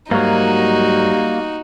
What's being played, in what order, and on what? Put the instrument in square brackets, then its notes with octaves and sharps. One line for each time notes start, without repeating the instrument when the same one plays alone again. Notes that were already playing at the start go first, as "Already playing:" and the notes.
[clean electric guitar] G#2 F#3 [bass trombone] G3 [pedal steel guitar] A#3 [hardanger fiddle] D#4 F#4